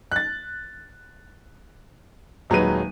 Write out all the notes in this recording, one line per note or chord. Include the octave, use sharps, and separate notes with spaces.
F#6 A6
D#1 F#3 G#3 D#4 B4 D#7